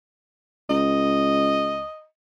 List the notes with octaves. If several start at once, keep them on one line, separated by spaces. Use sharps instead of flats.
C#2 D#5